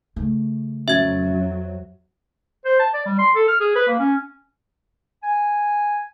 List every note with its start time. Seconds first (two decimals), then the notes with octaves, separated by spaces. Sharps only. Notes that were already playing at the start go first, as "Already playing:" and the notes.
0.16 C#3 A3
0.88 F2 F#3 C#4 F#4 E5 G#6
2.65 C5
2.80 A5
2.94 D5
3.06 G3
3.19 C6
3.35 A4
3.48 F6
3.60 G#4
3.76 B4
3.88 A#3
3.99 C#4
5.23 G#5